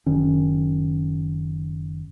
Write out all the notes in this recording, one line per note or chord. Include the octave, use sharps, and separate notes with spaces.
F#1 D#3 C#4